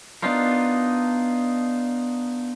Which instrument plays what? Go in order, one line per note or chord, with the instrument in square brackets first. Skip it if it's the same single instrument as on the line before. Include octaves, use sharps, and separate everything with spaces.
[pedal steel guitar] B3 D4 D#4 F4 A#4